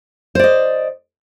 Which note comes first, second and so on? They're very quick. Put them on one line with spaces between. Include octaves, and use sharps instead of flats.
C5 D5 D#5